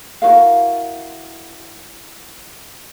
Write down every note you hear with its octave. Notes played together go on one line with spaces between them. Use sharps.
E4 F#4 A#4 F5